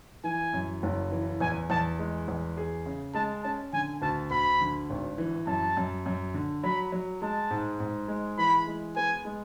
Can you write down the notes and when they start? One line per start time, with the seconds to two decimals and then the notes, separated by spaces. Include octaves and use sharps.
0.24 E3 G#5
0.54 F#2
0.83 F#1
1.11 E3
1.41 E2 G#5
1.70 E2 A5
1.99 G#3
2.28 E2
2.57 G#4
2.86 C#3
3.14 G#3 A5
3.43 C#4 A5
3.73 D3 G#5
4.02 D2 A5
4.31 D2 B5
4.61 D3
4.90 G#1
5.18 E3
5.47 F#2 A5
5.77 F#2
6.06 F#2
6.34 D3
6.64 F#3 B5
6.92 F#3
7.22 G#3 A5
7.51 G#2
7.80 G#2
8.08 G#3
8.38 E3 B5
8.67 G#3
8.96 B3 G#5
9.25 G#3